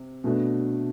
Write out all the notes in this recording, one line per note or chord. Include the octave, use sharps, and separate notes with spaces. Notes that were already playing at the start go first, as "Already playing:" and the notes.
Already playing: C3
B2 A3 D4